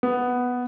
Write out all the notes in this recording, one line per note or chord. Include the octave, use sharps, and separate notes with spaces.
B3